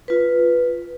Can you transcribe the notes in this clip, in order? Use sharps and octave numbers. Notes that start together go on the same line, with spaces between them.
F4 B4